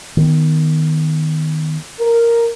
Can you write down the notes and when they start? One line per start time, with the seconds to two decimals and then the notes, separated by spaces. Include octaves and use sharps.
0.17 D#3 B3
2.00 A#4